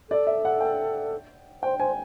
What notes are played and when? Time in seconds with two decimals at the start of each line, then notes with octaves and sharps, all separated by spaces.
0.10 A4 D5
0.27 E5
0.45 F#5
0.61 G5
1.63 C5 G5
1.79 C5 G#5